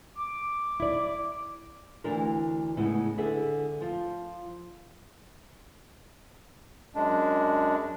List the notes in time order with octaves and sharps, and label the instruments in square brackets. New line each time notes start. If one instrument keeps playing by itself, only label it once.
[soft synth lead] D6
[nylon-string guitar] E4 D5
D2 E3 D4 E4 A#4
A2 C#3 G#3 B3 E4
D3 G#4 B4 E5
F3 F4
[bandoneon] F#2 G#3 D4